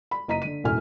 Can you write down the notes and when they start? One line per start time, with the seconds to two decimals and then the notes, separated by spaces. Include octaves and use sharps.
0.11 B5
0.28 F#1 D#5 A#5 B6 D#7
0.42 D3 D#7
0.64 E1 F#2 A2 G#5 F6